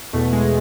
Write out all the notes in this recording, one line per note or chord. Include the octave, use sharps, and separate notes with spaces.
E2 B2 A3
G#3